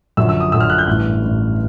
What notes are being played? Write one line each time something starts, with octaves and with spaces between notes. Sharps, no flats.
F#2 D3 F3 E6
E6
D#6
F#2 D3 F3 E6
F6
F#6
G6
A1 G2 E3 F#6
A1 G2 E3